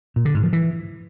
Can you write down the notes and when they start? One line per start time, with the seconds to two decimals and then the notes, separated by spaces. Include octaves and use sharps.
0.16 A#2
0.25 D3
0.34 G#2
0.44 F3
0.53 E3